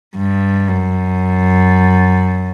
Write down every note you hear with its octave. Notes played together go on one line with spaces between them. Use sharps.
G2
F#2